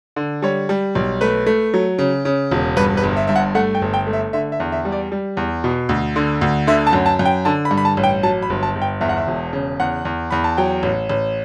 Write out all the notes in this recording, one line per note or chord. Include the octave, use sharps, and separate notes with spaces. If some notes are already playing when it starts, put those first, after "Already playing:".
D3
G3 C#5
G3
B1
A3 B4
A3
F#3
C#3
C#3
E1
G2 B4
B4
G1
E5
G2 E5
F#5
A3 F#5
G5
G1
G5
A3
E5
D3 E5
E5
E2
E5
G3
D5
G3
E2
B2
D2
D3
D2
D3 E5
A5
F#2
A5
F#2
G5
D3 A5
B5
G2
B5
A5
A1
G5
F#3 A5
B5
G1
A5
G1
G5
E2 E5
F#5
E5
E1
C#3
E2 F#5
E2
E2 B5
A5
F#3 G5
A1
A1